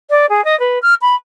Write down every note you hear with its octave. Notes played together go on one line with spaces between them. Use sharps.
D5
G#4
D#5
B4
F6
B5